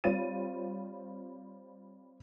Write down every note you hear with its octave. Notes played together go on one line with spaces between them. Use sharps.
G3 C4 F4 C#5 A6 D#7